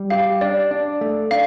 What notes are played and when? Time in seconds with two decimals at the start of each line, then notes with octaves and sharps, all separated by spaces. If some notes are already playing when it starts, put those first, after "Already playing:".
Already playing: G3
0.10 G4 F5
0.41 D4 D5
0.71 D4
1.01 A3
1.31 D4 F5